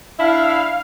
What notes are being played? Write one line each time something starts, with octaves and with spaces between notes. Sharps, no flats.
D4 E4 F5